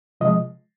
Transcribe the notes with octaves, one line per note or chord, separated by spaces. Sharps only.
C3 F3 G#3 D#5